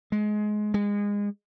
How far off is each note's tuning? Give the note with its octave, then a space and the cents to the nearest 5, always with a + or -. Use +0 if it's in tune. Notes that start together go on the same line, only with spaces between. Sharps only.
G#3 +20
G#3 -25